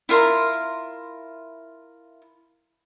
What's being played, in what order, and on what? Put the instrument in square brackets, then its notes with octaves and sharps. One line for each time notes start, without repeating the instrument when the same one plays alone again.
[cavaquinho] E4 F4 A#4 C6